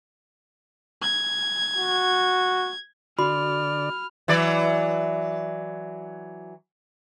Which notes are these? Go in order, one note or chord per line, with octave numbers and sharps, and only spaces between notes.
G#6
F#4
D3 F#4 D5 B5 F6
E3 F#3 D5